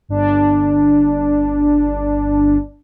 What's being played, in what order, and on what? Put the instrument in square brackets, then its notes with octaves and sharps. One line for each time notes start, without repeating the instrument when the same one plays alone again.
[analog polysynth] G1 D4